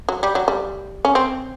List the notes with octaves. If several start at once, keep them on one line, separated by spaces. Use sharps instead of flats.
F#3
G3
F#3
G3
C#4
C4